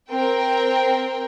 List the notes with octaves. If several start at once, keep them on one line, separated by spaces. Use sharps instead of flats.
C4 A#4 G5